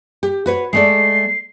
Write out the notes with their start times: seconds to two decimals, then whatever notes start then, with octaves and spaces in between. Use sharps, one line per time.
0.23 G4
0.46 F#4 B4 C#5
0.73 G#3 A3 D5 C7